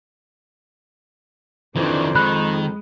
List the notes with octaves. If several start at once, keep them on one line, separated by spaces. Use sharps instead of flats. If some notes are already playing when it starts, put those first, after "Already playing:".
F2 D#3 E3 D4 C5 D5
D#3 G#3 B5 F#6